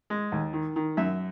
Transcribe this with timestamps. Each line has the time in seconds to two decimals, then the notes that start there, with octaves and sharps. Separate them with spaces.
0.10 G#3
0.32 D#2
0.53 D#3
0.76 D#3
0.97 F#2 E5